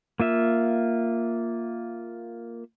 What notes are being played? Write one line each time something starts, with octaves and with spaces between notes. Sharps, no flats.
A#3 F4 E5